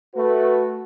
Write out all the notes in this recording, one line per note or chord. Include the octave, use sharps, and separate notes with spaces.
A3 F#4 B4